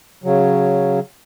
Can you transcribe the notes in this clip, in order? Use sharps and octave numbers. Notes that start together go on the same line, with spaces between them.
C#3 F#3